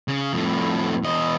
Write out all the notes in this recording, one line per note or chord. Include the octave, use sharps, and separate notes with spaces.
C#3
F2 A2
E2 D#5